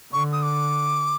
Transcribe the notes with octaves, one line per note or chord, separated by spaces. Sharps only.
D3 C#6
D#6
D6